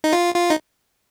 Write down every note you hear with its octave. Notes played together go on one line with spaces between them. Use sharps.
D#4
F4
F4
D#4